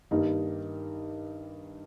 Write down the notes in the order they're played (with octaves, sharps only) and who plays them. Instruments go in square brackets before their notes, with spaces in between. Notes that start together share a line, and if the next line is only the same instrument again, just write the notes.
[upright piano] G2 D#3 G3 A#3 D#4